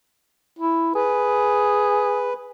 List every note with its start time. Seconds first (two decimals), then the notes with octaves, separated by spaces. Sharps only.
0.59 E4
0.95 G#4 B4